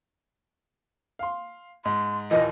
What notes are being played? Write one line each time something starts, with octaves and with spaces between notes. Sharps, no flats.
F5 C6
G#2 C6
D#2 A#2 E3 D#5